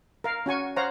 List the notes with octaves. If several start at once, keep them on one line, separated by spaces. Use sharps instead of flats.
A#4 F5
C#4 F#4 G#5 C#6
C5 C#5 F5 F#5 A#5